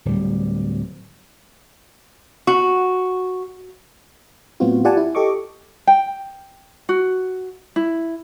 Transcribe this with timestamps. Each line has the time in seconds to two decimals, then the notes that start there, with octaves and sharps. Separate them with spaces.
0.05 D1 G3
2.47 F#4
4.60 A2 F#3 B3 C4 F4 F#4
4.85 F4 G4 D5 F#5 G#5 A5
4.97 E4
5.15 G4 A4 D#5 C#6 D6
5.87 G5
6.89 F#4
7.76 E4